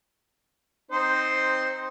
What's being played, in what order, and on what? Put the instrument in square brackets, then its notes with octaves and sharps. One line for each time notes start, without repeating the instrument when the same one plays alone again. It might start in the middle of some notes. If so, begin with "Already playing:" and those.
[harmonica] C4 D#4 C5